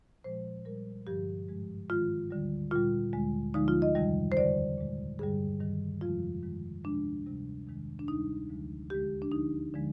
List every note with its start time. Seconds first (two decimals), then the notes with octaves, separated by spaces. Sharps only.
0.24 A#2 F3 G#3 C5
0.65 A#2 G3 A#4
1.07 G2 D3 F3 G4
1.48 G#2 F3 G#3
1.89 G#2 D#3 G#3 F4
2.31 D2 D3 G3
2.71 A#2 G3 F4
3.13 D2 D3 G#3
3.54 D2 D3 F3 G#3 D#4
3.68 F4
3.82 D#5
3.95 F2 C3 D#3 G3
4.32 C5
4.37 D#2 D3 G3 D5
4.78 A#2 G#3
5.19 G2 D3 G3 G#4
5.60 G2 D#3 G3
6.01 F2 C3 F3 G#3 F4
6.43 G2 D#3 G#3
6.84 D2 C3 F3 G#3 D4
7.26 D2 C3 G3
7.67 F2 C3 D#3 G#3
7.99 D4
8.08 D2 C3 G3 D#4
8.49 D2 D3 F3 G#3
8.90 D#2 D3 G#3 G4
9.22 D4
9.32 D2 D3 F3 D#4
9.74 D3 F3 G#3